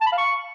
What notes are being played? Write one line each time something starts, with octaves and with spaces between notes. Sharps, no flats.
A5
B5
F5
C#6